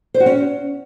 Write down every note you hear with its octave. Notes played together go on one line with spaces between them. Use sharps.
C5
F#4
C#4